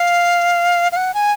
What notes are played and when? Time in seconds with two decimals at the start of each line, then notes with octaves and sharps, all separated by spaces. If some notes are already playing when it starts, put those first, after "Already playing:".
Already playing: F5
0.92 F5
0.96 F#5
1.14 G#5